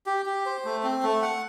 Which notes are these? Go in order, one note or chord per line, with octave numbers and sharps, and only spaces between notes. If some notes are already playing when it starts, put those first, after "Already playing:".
G4
G4
C5
A3
C4
A3
F#5